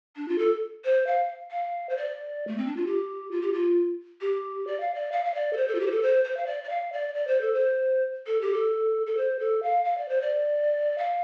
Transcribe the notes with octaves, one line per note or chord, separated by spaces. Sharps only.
D4
F4
A4
C5
F5
F5
C5
D5
A3
C4
D4
F4
G4
F4
G4
F4
G4
D5
F5
D5
F5
F5
D5
A4
C5
A4
F4
G4
C5
A4
C5
C5
F5
D5
D5
F5
D5
D5
C5
A4
C5
A4
G4
A4
A4
C5
A4
F5
F5
D5
C5
D5
F5